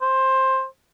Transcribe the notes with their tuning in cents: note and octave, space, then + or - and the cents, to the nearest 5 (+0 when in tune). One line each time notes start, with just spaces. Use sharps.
C5 +15